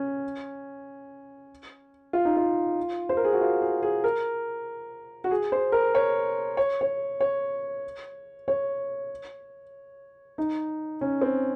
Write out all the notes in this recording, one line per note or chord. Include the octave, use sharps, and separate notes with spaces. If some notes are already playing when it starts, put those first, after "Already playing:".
Already playing: C#4
F4
D#4
F4
C5
A#4
G#4
F#4
F4
G#4
G#4
A#4
F#4
G#4
C5
A#4
C#5
C#5
C#5
C#5
C#5
D#4
C#4
C4